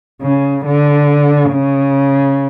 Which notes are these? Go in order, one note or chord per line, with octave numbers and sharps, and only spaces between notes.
C#3
D3
C#3